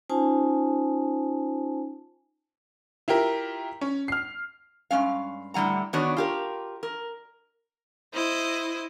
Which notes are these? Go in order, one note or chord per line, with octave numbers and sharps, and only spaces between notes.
C#4 D#4 F4 C5 G#5 A5
E4 F4 G4 A#4
C#4
F6 C7
G2 G#3 C#4 F5
A2 D3 G3 F#5 A#5
D#3 B3 D4 F#4 C#5
F4 G4 A#4
A#4
E4 C5 D#5